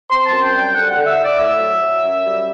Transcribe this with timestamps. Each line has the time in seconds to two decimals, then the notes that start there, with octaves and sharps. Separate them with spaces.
0.10 C4 C6
0.26 A5
0.31 F#2
0.42 G5
0.53 G3
0.58 G5
0.74 D3 F#5
0.90 D3 F#5
1.06 E5
1.17 E4
1.23 D5
1.38 A2 E5
1.60 F#3
1.81 F#3
2.03 F#2
2.25 G3